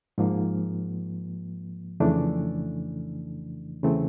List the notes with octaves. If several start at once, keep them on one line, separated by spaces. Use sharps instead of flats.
G#2 F3 A#3
F2 C#3 E3 A3 D4
E2 C#3 E3 A3 C4